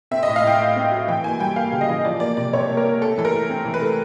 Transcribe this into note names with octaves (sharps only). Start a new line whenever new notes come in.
C4 E5
D#5
A2
F5
A2 G5
A2
C4
F#3
E3 G5
A#3 G#5
G3 G5
A#3 F5
C#3
D#5
E3
F3 D5
A#3 D5
C3 D5
C3 C#5
A#3
A#4
A#3
A3 A4
E3 A4
A#4
A3
C4
E3
B4
A3